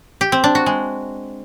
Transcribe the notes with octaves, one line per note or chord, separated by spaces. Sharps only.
G4
C4
D4
F#4
G#3